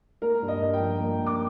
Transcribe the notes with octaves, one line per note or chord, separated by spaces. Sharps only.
A#3 A#4
G2
D#5
G2
G5
F3
A#3
G2
D6